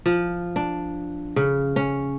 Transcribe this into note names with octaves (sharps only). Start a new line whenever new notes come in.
F3
D4
C#3
C#4